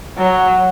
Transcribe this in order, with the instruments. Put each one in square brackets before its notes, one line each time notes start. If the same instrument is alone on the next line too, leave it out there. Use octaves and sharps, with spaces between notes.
[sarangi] F#3